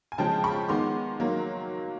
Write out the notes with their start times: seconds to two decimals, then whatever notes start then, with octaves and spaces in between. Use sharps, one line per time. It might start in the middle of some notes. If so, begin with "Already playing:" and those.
0.12 G#5
0.18 C#3 F3 G#3 G5 A5
0.44 B5 C#6
0.68 D#3 G#3 B3 C6 D6
1.20 D#3 F#3 A#3